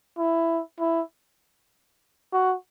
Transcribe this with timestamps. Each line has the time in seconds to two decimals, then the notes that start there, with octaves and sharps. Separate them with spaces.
0.18 E4
0.80 E4
2.33 F#4